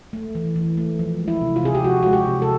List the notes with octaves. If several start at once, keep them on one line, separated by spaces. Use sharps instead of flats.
A3
E3
E3
A3
F3
G#3
E4
C3
F4
C3 G#4
G4
F3 F#4
G#3 F#4
G4
C3
A4